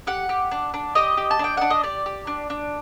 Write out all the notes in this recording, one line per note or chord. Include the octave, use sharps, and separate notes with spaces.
G4 F#5
G4
D4
D4
G4 D#5
G4
A5
D4 G5
D4 F#5
D#5
G4 D5
G4
D4
D4